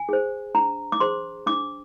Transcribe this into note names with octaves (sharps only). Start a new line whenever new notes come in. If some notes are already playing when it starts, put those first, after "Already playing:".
Already playing: G#5
G#4 C5
D4 A#5
D6
G#4 C5 C6
D4 D6